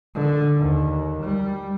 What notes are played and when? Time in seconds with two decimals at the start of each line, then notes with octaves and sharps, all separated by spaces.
0.15 D3
0.59 D#2
1.23 G3